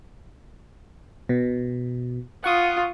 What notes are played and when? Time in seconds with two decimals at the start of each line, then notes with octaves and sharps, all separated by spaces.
1.29 B2
2.44 F4 F#5 C#6 D#6